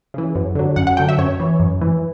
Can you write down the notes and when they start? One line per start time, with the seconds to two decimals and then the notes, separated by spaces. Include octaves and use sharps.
0.14 C#3 E3
0.35 F#2
0.55 D3 F#3
0.76 F#2 F#5
0.87 F#5
0.97 D3 F#3 G5
1.09 E5
1.18 F#2 C#5
1.40 E3
1.60 F#2
1.81 E3